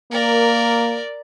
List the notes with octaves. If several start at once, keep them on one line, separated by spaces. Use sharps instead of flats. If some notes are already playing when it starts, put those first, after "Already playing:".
A#3 A#4 D5